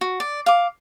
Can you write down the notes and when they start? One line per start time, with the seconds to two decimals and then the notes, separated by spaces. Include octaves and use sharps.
0.01 F#4
0.20 D5
0.46 F5 D6